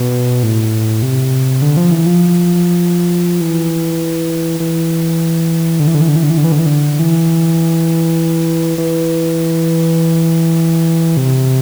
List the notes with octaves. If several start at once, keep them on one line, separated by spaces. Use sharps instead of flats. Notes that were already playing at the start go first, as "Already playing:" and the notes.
Already playing: B2
A2
C3
D3
F3
E3
F3
E3
E3
D3
E3
D3
E3
D3
E3
D3
E3
D3
E3
D3
E3
D3
E3
E3
C3